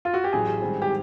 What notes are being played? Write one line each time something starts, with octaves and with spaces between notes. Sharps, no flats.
F4
F#4
G4
A1 A2 F#3 G#4
G#2 D#3 G3 C4
G4